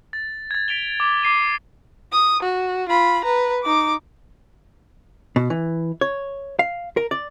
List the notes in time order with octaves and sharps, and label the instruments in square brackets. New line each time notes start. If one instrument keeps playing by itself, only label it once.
[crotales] A6
G#6 A6
B6 D7 F7 G7
D6
D6 C7 D#7
[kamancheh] D#6
F#4
F4 B5
B4 A#5
D#4 D6
[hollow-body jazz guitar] B2
E3
C#5
F5
A#4
D5